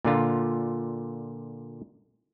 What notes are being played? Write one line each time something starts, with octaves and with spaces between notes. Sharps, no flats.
A#2 D3 F4